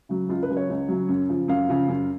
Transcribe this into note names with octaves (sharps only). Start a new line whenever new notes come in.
C#3 F#3
C#2 F4
B4
C#3 F#3
C#5
C#2
C#3 F#3
F#2
C#3 F3
F#2 F5
C#3 F3
F#2